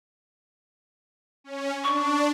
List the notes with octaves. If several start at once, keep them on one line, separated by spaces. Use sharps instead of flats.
C#4
D4 C#6